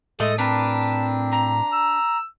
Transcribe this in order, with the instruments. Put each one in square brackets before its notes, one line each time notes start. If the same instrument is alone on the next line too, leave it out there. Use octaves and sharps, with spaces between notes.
[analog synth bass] A2 [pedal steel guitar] G#3 A3 [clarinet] A4 [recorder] D#5
[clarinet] C4 [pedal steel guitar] D4 A#4 B4 [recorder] A5
[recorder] A#5
[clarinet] E6